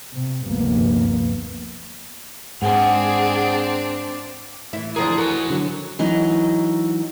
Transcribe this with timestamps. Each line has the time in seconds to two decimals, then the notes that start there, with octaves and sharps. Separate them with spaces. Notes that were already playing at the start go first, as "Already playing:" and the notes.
0.12 C3
0.45 F1 D2 G2 A#3 B3
2.62 G#2 C4 D4 G#4 F#5
4.73 A2 E3 E4
4.96 D3 F3 G#4 A#4
5.18 F#4 A#4 G#5
5.50 D3 F#3
5.99 E3 F#3 D#4